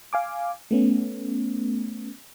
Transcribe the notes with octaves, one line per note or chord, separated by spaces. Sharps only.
F5 G#5 D6
A3 B3 C#4